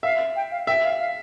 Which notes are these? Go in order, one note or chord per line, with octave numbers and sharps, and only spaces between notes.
E5 F5
G5
F5
E5 G5
F5
F5